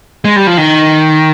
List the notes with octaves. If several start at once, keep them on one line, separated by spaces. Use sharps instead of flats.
G#3
G3
F3
D#3